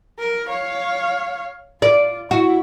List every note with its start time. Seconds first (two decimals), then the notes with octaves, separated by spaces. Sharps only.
0.19 A#4
0.49 C#5 F5
1.82 F4 D5
2.31 E4 F#4